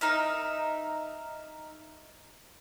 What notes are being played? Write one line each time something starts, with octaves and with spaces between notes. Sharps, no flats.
D#4 A#4 E5